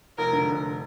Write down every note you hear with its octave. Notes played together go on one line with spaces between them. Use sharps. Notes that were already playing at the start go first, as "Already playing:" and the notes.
F1 A#4
D3
F1